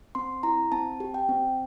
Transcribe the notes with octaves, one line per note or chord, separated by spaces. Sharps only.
C4 C6
E4 A#5
C4 A5
G4
G5
C4